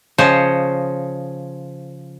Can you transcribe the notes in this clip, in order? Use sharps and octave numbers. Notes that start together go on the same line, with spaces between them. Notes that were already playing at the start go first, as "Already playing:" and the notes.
C#3 F3 C5 C#5 D#5